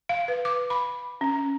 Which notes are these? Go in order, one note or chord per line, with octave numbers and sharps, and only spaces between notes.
F5
B4
D6
B5
C#4